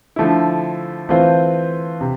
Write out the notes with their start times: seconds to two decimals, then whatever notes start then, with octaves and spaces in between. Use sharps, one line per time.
0.16 D3 F3 A3 E4
1.09 E3 A3 C4 F4 C5
2.01 C3